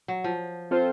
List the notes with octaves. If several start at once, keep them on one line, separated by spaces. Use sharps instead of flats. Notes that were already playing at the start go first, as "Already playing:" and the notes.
F#3
F3
C4 F4 A4 C5